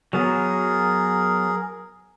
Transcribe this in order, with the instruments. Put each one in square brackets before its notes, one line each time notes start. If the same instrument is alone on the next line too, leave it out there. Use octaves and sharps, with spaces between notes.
[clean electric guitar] F#3 B3 [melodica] G#4 A#4